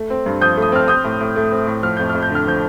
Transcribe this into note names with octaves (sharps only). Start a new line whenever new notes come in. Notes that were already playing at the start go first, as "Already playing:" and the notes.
Already playing: A3
C4
G2
F3 D#6 G6
A3
D#6
C4 F6
C4 D#6 G6
A2
A2
A3
C4
A2
F3 F6
F2 G6
F2 F6
G6
D3 F6
F3 G6